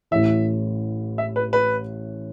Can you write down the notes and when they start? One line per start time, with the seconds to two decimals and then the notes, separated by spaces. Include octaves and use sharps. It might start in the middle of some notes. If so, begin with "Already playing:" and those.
0.11 A1 A2 E3 E5
1.18 E5
1.36 B4
1.53 B4